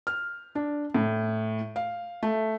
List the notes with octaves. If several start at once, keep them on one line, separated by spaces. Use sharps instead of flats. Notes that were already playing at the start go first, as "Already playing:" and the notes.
F6
D4
A2
F5
A3